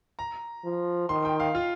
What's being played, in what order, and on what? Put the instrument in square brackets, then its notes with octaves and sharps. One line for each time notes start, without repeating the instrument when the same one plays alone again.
[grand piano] A#5
[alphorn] F3
[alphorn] D#3 [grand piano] C6
[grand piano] G5
F5
F4